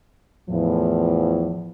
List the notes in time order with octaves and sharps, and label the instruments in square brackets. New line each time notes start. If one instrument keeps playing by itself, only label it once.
[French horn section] E2 A2 F3